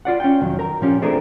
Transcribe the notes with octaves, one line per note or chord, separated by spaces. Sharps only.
F4 D5 F#5
C#4 F4 G5
C2 F2 D#3 F#3
A#4 A#5
A#2 F3 C#4 G4
E3 A3 C4 D4 G#4 A#4